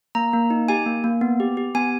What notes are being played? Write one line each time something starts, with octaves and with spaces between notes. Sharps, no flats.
A#3 A#5
A#3
D#4
G4 G#5
A#3
A#3
B3
G4
G4
B3 G#5